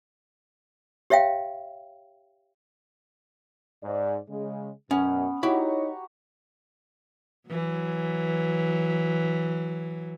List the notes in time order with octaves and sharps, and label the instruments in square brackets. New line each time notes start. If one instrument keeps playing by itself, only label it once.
[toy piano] G4 C#5 E5 F5 G5
[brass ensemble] G#2 D5
C#3 G#3
[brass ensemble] F#2 B2 [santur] B3 [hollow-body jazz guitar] C#4
[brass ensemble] D#4 C#5 [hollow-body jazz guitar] E4 B5 [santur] F#4 G4 A#5
[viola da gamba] E3 F#3